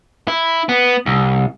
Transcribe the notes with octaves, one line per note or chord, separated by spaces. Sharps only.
E4
B3
C2